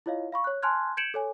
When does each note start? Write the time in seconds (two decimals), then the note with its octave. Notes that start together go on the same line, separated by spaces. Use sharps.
0.06 E4 F4 C#5 D#5 F5
0.32 F5 B5 C#6
0.44 C#5 F#6
0.62 G#5 A5 C6 F6 F#6 G#6
0.97 G6 G#6 C#7 D7 E7 F#7
1.14 A4 C#5 G#5